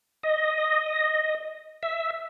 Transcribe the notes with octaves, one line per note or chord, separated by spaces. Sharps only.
D#5
E5